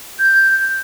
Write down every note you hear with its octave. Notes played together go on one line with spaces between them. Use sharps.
G6